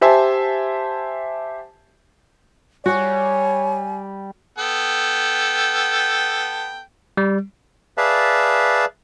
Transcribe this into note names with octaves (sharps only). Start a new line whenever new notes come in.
G4 C5 E5 G#5 A5
G3 F#4 C#5 G#5
B3 A4 G5
G3
G#4 B4 D5 E5 F5 A5